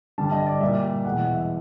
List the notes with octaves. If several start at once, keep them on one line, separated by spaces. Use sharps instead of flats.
G2 D3 G3 A5
D#5
D5
A#2 G3 E5
E2 B2 G#3 F#5
F#5
E5